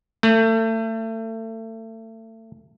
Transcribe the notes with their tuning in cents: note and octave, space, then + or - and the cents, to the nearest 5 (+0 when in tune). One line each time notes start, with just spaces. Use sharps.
A3 +30